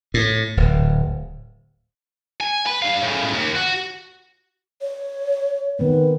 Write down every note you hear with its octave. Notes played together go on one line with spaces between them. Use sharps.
A2
D1
G#5
B4
G2 F5
A2 C#3
D#2
F#4
C#5
D#3 B3 C4 B4